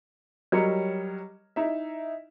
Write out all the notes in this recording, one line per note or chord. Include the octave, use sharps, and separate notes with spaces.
F#3 G3 A#4 C#5 D#5
D#4 E4 E5